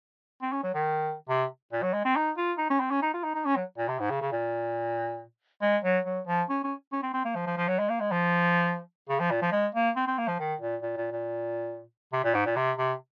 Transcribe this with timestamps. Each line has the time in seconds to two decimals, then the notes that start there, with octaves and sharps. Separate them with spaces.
0.42 C4
0.53 C#4
0.63 F#3
0.75 D#3
1.29 C3
1.73 A#2
1.83 F#3
1.93 G#3
2.05 C4
2.16 D#4
2.38 F4
2.58 D#4
2.70 C#4
2.80 C4
2.91 C#4
3.02 D#4
3.14 F4
3.24 D#4
3.35 D#4
3.46 C#4
3.56 F#3
3.78 A#2
3.88 C3
3.99 G#2
4.10 C#3
4.21 C#3
4.32 A#2
5.62 G#3
5.84 F#3
6.05 F#3
6.28 F3
6.50 C#4
6.64 C#4
6.92 C#4
7.03 C4
7.14 C4
7.25 A#3
7.36 F3
7.47 F3
7.58 F3
7.68 F#3
7.79 G#3
7.90 A#3
8.01 G#3
8.12 F3
9.10 C#3
9.20 F3
9.31 A#2
9.42 F3
9.52 G#3
9.75 A#3
9.96 C4
10.08 C4
10.18 A#3
10.28 F3
10.39 D#3
10.61 A#2
10.82 A#2
10.97 A#2
11.12 A#2
12.13 C3
12.24 A#2
12.35 G#2
12.46 A#2
12.57 C3
12.78 C3